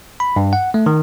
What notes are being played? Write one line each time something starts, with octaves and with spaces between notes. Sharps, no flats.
B5
G2
F#5
A3
D#3